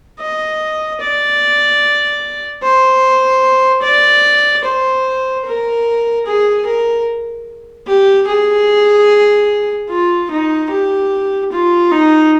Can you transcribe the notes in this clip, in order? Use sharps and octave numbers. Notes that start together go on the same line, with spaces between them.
D#5
D5
C5
D5
C5
A#4
G#4
A#4
G4
G#4
F4
D#4
G4
F4
D#4